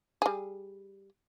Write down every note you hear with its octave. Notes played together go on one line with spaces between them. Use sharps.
G3 G#4